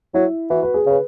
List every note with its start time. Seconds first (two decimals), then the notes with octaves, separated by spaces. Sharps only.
0.14 F#3 E4
0.50 E3 F#4
0.63 B4
0.74 G#4
0.86 C#3 B4